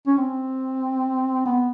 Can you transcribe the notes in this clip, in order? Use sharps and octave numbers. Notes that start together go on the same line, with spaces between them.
C#4
C4
B3